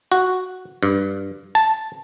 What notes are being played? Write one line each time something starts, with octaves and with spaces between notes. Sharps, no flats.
F#4
G2
A5